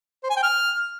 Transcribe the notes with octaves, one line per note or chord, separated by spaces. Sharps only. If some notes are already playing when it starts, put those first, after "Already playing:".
C5
G#5
G5
F6